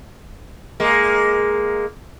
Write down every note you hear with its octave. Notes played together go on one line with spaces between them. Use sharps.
G#3 A#3